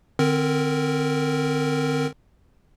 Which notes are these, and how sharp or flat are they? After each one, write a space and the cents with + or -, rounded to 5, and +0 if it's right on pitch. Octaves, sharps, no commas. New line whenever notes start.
D3 +30 C4 +0 A#4 +0